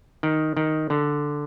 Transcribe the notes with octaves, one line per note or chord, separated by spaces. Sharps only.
D#3
D#3
D3